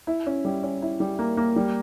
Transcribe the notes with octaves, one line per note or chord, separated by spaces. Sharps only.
E4
C#4
G3
C#4
E4
G3
A#3
A#3
G3